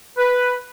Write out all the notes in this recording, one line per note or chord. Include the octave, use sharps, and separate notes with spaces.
B4